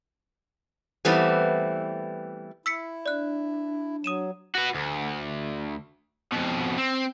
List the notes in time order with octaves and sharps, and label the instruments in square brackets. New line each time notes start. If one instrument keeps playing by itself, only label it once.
[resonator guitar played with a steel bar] E3 G3 A3 B3 C4
[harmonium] E4 [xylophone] E6 B6 C#7
[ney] D4 [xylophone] D5 F#6
[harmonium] F#3 [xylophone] D#6 D#7 E7
[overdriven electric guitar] F#4 B4
D2
F2 B2
C4